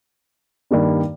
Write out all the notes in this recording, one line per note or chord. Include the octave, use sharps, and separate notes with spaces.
G2 D#3 G3 A#3 D4